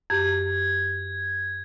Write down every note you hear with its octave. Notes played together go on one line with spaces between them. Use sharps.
F#2 G4 G#6